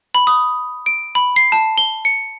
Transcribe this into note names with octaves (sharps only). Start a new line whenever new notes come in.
B5
D#6
D7
B5
C7
A5
G7
C#7